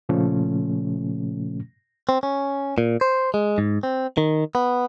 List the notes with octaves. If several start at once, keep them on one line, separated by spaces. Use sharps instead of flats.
A#2 C#3 F3 A3 C#4
C4
C#4
A#2
C5
G#3
G#2
C4
D#3
B3